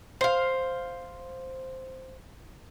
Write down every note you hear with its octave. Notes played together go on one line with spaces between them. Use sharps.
C5 F5